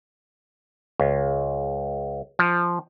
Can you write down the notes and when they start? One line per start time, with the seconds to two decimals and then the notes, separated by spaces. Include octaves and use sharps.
1.00 C#2
2.39 F3